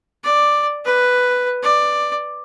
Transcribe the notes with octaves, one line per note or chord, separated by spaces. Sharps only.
D5
B4
D5